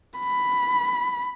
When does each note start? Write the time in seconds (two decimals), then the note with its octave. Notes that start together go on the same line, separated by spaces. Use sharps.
0.20 B5